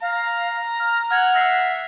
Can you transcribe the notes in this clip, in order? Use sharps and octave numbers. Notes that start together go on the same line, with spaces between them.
F5 A#5
F6
F#5 F6 G#6 F7
E5 F6 A#6 C7